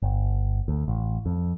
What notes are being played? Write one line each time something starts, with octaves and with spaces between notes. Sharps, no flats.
G1
D2
A1
F2